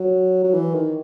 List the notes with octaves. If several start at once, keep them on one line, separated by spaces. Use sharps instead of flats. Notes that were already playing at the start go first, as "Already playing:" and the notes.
Already playing: F#3
F#3
E3
D#3